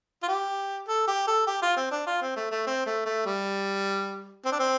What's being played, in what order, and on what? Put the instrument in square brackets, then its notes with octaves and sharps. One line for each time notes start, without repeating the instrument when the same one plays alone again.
[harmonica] F4
G4
A4
G4
A4
G4
F4
C4
D4
F4
C4
A3
A3
C4
A3
A3
G3
C4
D4
C4